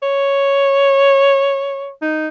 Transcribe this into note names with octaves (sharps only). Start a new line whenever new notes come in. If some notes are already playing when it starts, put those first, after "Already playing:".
C#5
D#4